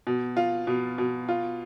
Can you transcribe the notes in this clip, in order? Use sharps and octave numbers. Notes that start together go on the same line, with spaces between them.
B2
F4
B2
B2
F4